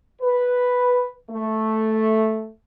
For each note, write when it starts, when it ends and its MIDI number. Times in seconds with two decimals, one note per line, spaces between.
0.22 1.10 71
1.31 2.47 57